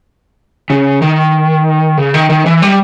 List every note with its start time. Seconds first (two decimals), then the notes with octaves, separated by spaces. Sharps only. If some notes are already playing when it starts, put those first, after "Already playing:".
0.70 C#3
1.02 D#3
1.97 C#3
2.14 D#3
2.30 D#3
2.46 E3
2.62 G3